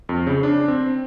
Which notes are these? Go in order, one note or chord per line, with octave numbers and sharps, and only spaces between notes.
F2
C#3
D4
C4